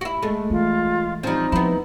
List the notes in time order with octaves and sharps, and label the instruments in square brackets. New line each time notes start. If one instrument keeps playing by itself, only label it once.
[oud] E4 F#4
[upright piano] G#3 [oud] A3
[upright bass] E3 [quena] F4
[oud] F3 G3 [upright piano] C4 [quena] D#4
[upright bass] F3 [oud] B3 E4